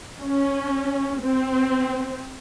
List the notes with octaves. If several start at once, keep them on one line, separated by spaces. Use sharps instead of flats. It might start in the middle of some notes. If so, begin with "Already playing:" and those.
C#4
C4